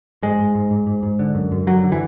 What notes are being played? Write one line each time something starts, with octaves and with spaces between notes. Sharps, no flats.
G#2 G#3
G#2
G#2
G#2
G#2
G#2
D3
F#2
F#2
D3 F#3
D3
E3